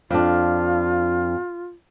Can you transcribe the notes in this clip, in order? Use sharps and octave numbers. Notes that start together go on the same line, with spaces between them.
F2 D4 F4